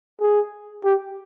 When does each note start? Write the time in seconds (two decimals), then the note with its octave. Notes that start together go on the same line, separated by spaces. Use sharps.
0.21 G#4
0.84 G4